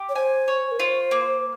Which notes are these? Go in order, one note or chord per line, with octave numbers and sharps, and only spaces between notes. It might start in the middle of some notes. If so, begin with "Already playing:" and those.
Already playing: G4
C#5
C5 G#5
C#5
A#4
F4 C5
A#3